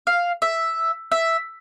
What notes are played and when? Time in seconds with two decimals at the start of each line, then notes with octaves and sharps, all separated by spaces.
0.07 F5
0.42 E5
1.12 E5